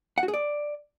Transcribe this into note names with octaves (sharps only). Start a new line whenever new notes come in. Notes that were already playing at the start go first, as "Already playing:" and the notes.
F#5
F#4
G#4
D5